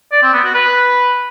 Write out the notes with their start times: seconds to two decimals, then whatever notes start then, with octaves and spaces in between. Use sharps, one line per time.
0.12 D5
0.23 C4
0.33 B3
0.44 F#4
0.54 B4